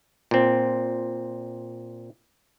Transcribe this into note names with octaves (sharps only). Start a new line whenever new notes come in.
A#2 C4